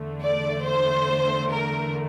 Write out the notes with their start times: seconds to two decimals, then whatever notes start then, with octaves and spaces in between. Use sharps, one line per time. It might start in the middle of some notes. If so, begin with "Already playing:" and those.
Already playing: E2 D3 A3
0.22 D5
0.65 C5
1.51 A#4